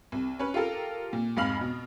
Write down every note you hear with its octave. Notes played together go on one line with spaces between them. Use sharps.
C2
C#4 B4
F4 G4 A4 A#4
A#2
F1 G#2 F5 B5 F6 F#7
B2